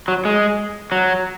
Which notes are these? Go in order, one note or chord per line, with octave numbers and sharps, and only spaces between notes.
F#3
G#3
F#3